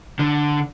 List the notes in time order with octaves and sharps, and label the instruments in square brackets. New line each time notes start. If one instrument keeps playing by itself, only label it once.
[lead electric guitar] D3